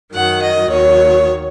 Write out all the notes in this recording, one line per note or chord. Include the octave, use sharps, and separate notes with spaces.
F#2 D#3 F#3 F#5
D#5
D#2 D#3 F#3 C#5